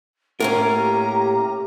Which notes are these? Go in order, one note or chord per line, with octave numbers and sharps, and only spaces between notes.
A2 A#3 C#4 A#4 A#5
G4